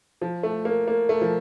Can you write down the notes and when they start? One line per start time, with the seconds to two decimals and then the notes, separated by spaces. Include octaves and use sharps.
0.22 F3
0.43 A3
0.65 A#3
0.88 A#3
1.09 A3
1.21 F3